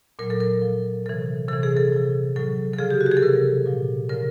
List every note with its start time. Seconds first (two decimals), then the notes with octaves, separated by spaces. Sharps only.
0.19 A#2 F#3 A#4
0.30 A4
0.40 A#4
0.62 A#2 F3
1.06 C3 E3 A4
1.48 C3 E3 A4
1.63 G#4
1.77 A4
1.92 C3 F3
2.36 A2 F#3 A4
2.73 A4
2.79 C#3 F3 G#4
2.90 G4
3.01 F#4
3.06 G4
3.12 G#4
3.17 A4
3.22 C3 E3 A#4
3.66 A#2 F3
4.09 C#3 F3 A#4